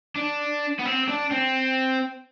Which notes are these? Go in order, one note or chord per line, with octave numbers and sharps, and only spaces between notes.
D4
B3
C4
D4
C4